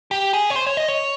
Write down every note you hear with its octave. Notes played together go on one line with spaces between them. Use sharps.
G4
G#4
C#5
C5
C#5
D#5
C#5